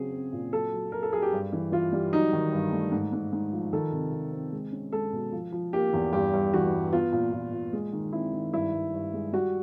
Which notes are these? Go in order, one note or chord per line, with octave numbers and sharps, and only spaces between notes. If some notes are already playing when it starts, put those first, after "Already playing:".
Already playing: C#3 F#3 C4 G#4
C4
A#2
F#3 A4
F#3
F#3 A#4
A4
F#3 G#4
G4
G2
E3
E3 F4
G3
F#3 D#4
D#3
G2
A3
G#2
G#2
G#2
F3
D#3 A4
C3
C3
C4
G#3
C#4
G#3 A4
B2
F3
F3
A#3 G4
E2
G2 G4
G2
E3 F#4
G2
B3 F4
A#2
A#2
A#2
G#3
D#3
C4 E4
D#3
G2 E4
G2
G2
G#3
G3 F#4